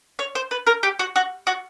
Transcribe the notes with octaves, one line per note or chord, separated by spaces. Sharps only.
C#5
C5
B4
A#4
G4
F#4
F#4
F#4